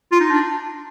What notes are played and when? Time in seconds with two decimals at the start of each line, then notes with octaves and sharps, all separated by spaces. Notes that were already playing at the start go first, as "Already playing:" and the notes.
0.12 F4
0.20 D#4
0.30 D4